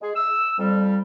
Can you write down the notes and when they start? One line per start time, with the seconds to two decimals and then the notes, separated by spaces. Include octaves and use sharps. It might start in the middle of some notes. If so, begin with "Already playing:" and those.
0.02 G#3 G#4
0.16 E6
0.59 F2 G3